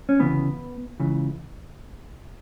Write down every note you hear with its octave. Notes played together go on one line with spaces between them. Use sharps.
C#4
D2 C#3 E3 B3
C#2 C#3 E3